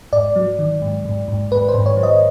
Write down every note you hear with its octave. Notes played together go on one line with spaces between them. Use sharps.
G#2 D5
F#3
D#3
G#2
G#2
G#2
G#2 B4
C5
G#2
C#5
F#3
D#5